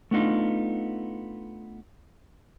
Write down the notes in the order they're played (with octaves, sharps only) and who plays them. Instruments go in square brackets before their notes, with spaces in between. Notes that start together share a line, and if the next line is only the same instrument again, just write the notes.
[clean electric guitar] A3 B3 D4 D#4 F4